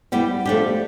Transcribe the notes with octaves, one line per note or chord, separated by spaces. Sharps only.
G3 B3 E4 G4
F3 A3 D4 G4